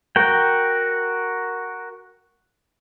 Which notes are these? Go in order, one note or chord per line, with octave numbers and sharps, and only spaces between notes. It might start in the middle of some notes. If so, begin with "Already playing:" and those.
F#4 A#4 G5